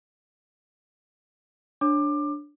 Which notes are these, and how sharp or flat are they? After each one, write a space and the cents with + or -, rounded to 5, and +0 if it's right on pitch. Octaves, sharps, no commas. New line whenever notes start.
D4 +0 C#5 -15 D6 +20